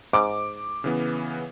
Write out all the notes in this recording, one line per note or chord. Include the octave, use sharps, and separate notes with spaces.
G#2 D6
C#3 E3 B3